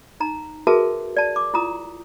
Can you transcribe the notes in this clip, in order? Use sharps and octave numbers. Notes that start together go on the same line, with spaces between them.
D#4 A#5
F#4 G#4 A#4 B4 E5 A5
D5 A5
D6
E4 F4 A#5 D#6